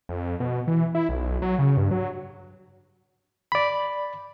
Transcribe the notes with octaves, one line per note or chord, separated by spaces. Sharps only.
F2
B2
E3
E4
B1
F#3
C#3
G2
F#3
D5 B5